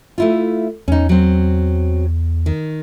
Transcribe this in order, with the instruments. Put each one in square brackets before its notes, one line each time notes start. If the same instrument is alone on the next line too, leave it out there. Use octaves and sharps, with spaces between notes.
[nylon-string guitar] A3 E4 F4
[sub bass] E2 [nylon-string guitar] C#4 D#4
[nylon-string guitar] F#3 C4
D#3